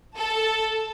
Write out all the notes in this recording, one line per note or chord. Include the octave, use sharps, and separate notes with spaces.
A4